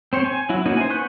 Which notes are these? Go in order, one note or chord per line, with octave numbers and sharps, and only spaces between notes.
C4 C5 C#5 G5
G#5
F#3 E4 F#4
A#3 C#4 D#4 E4 F#4
C5 G#5
B3 C#6 F#6 G6